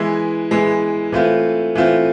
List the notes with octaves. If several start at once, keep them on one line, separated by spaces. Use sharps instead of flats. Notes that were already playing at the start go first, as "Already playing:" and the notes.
Already playing: E3 G#3 B3 E4
E3 G#3 B3 E4
E3 A3 C4 F4
E3 A3 C4 F4